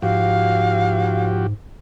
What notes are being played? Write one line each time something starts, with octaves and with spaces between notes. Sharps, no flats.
G#2 F3 F#4 G4 F5